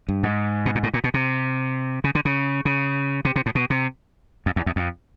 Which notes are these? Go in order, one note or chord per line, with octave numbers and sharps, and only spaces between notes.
G2
G#2
B2
A#2
A2
A#2
B2
C3
C#3
D3
C#3
C#3
C3
C3
A2
B2
C3
F2
E2
E2
F2